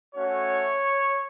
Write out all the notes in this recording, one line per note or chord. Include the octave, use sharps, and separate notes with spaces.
A3 C#4 F#4 C#5